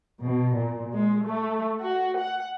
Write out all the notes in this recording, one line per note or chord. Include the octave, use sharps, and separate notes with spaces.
B2
A#2
G#3
A3
F#4
F#5